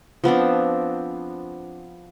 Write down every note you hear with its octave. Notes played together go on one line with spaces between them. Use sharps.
F3 B3 C4 D4